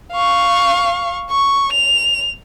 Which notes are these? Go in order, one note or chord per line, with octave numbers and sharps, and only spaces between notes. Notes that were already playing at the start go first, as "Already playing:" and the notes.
F5 C#6
C#6
F7